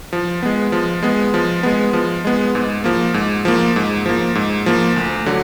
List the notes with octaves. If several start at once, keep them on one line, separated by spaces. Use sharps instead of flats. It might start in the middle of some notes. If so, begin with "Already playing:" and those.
F3
G#3 B3
F3
G#3 B3
F3
G#3 B3
F3
G#3 B3
G#2
F3 A#3
G#2
F3 A#3
G#2
F3 A#3
G#2
F3 A#3
D2
D3 F#3